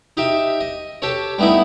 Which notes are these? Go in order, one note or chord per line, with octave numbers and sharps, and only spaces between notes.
D#4 G4 E5
D#5
G4 A4 C#5
G3 A3 B3 D#4 E4